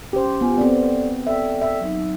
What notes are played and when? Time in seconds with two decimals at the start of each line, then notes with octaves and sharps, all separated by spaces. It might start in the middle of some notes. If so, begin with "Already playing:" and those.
0.13 C#4 G4 C5
0.41 B3 F4 G4 G#5
0.58 B3 C4 A4 D5
1.27 A4 D5 E5 G5
1.62 E5
1.80 F#3 D#4